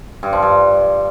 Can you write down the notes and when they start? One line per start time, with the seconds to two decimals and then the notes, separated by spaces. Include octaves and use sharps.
0.23 G2
0.33 F3
0.42 G2